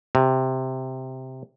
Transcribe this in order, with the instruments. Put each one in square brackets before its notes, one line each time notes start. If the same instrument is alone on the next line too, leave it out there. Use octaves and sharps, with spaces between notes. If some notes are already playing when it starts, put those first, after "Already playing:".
[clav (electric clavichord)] C3